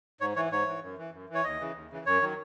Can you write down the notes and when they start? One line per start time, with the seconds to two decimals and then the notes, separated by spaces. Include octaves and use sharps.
0.21 G#2 C#5
0.36 E3 C#5
0.51 G#2 C#5
0.67 E3
0.83 F#2
0.98 E3
1.13 F#2
1.29 E3
1.34 C#5
1.44 D#2 D#5
1.60 C#3 E3
1.75 D#2
1.90 C#3 E3
2.06 F#2 C#5
2.21 D#3 F#3